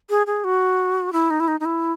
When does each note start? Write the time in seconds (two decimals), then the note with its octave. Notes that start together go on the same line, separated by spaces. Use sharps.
0.10 G#4
0.27 G#4
0.44 F#4
1.13 E4
1.30 D#4
1.40 E4
1.48 D#4
1.60 D#4
1.65 E4